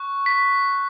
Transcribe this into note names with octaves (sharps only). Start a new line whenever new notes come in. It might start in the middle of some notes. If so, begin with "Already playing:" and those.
Already playing: C#6 F#6
B6